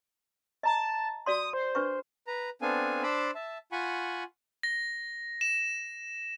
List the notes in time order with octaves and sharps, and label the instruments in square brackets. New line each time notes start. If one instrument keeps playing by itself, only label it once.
[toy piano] D#5 A#5 [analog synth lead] A5
[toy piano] F#4 D5 C6 [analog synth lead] D#6
[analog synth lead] C5
[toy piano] D4 B4 C#6
[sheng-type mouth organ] B4 A#5
B3 C4 D4 A4 F5 G#5
D4 C5 A5 B5 D6 E6
E5 A5
F4 F#5 G#5 B5 C#6
[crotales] A#6
E7